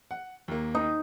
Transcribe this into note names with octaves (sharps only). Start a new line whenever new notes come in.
F#5
D#2 A#3
D#4